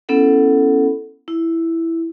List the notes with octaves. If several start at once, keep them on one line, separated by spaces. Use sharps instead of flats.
B3 C#4 E4 A4 F#5
E4